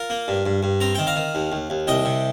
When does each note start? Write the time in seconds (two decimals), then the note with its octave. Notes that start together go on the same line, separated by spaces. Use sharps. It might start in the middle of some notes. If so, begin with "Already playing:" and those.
Already playing: F4 A#4
0.10 A#3
0.28 G2
0.46 G2
0.63 G2
0.80 C4 A#5
0.95 D#3 G5
1.07 F5 A#5
1.16 D#3
1.35 D#2
1.52 D#2
1.70 D#2
1.87 C2 D#5 G5
2.05 C3